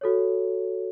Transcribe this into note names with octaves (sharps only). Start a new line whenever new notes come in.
F#4 A4 C#5